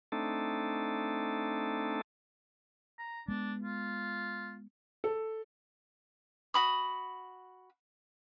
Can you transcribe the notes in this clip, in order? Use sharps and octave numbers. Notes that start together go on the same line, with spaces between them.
A3 C4 D4 D#4 A4
A#5
G#3 B3 D4
F4
A4
F#4 B5 D#6